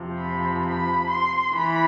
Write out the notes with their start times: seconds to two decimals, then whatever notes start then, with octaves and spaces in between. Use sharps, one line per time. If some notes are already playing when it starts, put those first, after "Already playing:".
Already playing: F2 C3 F3
0.20 B5
0.66 B5
1.11 C6
1.56 E3 B5